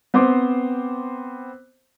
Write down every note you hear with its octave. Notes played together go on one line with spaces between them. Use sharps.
B3 C4 C5 D6